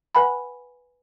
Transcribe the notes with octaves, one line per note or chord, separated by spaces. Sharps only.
B4 F#5 G#5 B5